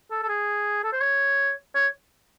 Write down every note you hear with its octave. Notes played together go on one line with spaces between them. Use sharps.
A4
A4
G#4
A4
C5
C#5
C#5